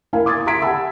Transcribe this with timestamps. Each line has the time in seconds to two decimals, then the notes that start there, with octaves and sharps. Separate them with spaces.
0.13 A#3 E4 F5 G#5
0.26 D6 D#6 G#6 A6
0.47 E5 A#5 C6 G#6 B6 D7
0.62 G4 F#5 G#5 A5 B5 E6